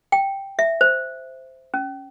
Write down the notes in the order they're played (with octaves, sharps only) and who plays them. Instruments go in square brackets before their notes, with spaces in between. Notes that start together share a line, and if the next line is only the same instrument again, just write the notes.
[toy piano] G5
E5
C5
C#4